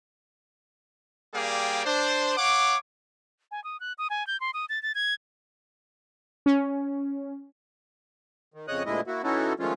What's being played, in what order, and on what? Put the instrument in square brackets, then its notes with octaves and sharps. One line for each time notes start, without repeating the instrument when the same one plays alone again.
[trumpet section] G3 A#3 G#4 D5 F5 G5
D4 C5
C#5 F5 F#5 D6
[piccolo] G#5
D#6
F#6
D#6
G#5
G6
C6
D#6
A6
A6
G#6
[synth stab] C#4
[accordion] D#3
F2 C#3 C#5 D#5 D#6 F#6
D2 A#2 D3 G#3 E4 D#5
A#3 E4 F#4
E3 C#4 D#4 E4 F#4 A4
D#3 F3 G#3 A3 C#4 F4